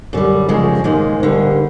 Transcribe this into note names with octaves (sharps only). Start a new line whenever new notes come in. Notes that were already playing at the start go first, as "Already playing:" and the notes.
F#2 D3 G3
F#2 C#3 F3 G#3
G#2 D#3 G#3 A#3
D2 D3 G3